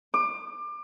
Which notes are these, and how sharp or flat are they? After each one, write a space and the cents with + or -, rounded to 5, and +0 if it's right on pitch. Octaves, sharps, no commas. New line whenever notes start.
D6 +30